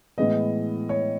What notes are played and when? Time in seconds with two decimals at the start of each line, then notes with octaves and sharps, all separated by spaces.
0.18 A2 E3 G#3 B3 D#5
0.89 C#5